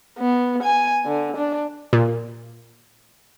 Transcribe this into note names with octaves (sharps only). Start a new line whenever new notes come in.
B3
G#5
D3
D4
A#2